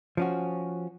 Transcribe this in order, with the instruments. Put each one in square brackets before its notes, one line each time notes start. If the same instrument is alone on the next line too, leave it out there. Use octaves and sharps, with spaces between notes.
[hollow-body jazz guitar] F3 C#4 F#4